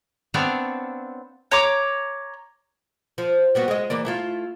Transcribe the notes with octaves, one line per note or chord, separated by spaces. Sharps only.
B3 C4 D4 C#5 E5 F5
C#5 A#5 D6
F3
G3 B3 F#4
G#3 D#5
E3 A#3 D5
A3 E4 F4